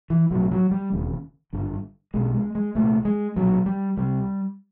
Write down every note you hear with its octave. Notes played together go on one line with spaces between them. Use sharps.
E3
B1 A2 F#3
F#3
G3
E1 D#2 C#3
G#1 G2 D3
B1 B2 G#3
G#3
G#3
C2 A#2 A3
G#3
B1 A#2 F#3
G3
C2 C3 G3